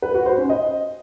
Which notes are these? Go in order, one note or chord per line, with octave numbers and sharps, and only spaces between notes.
B4
F#4
C5
C#4
D#5